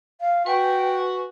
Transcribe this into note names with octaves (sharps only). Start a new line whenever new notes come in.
F5
F#4 B4 G5 G#5